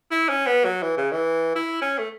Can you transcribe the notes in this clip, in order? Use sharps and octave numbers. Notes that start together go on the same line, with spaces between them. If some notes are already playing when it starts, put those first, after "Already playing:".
E4
C#4
B3
F#3
E3
C#3
E3
E4
C#4
A3